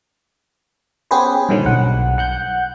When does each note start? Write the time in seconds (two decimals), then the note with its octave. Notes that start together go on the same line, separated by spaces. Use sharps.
1.11 B3 C#4 G4 G#4 B4 C5
1.49 G2 A#2 D3 D#3 F#3
1.65 B1 F#5
2.18 F#5 F#6 G6